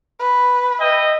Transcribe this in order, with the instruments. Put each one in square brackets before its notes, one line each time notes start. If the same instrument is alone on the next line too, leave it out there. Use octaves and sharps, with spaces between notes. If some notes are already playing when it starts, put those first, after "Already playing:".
[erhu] B4
[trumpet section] D#5 E5 G5